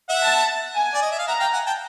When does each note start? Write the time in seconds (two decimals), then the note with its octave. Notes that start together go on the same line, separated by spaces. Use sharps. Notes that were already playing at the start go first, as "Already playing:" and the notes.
0.09 E5 F#5
0.23 A5
0.75 G#5
0.94 D5
1.02 D#5
1.11 E5
1.19 F5
1.27 E5 F#5 A#5
1.40 F5 G5
1.53 F#5 G#5
1.66 G5 A5